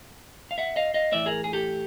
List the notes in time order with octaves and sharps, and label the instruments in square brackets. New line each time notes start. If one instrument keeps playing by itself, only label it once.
[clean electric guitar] F5
E5 F#5
D#5 F5
D#5 F5
A2 E3 D5 E5
G#4 A#4
G#4
G4 A4